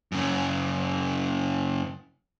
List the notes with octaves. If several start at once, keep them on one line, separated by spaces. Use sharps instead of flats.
F#2 C#3